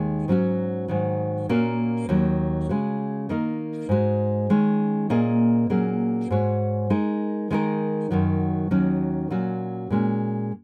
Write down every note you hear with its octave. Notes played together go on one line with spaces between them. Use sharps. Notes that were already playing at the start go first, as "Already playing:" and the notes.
Already playing: D#2 D#3 G#3 D#4
G#2 F#3 C#4 F#4
G#2 D#3 F#3
A#2 A#3 C#4 F#4
D#2 D#3 F#3
C#3 G#3 F#4
D#3 A#3 D#4 A#4 D#5
G#2 G#3 F#4
D#3 G#3 C#4
A#2 A#3 C#4 G#4 D#5
A#2 F#3 A#3 C#4 G#4
G#2 G#3 F#4 C#5
G#3 D#4 A#4
D#3 G#3 D#4 A#4
F#2 D#3 F#3
D#2 D#3 F#3 C#4 F#4
A#2 F#3 C#4 F#4
A#2 G#3 C#4 F#4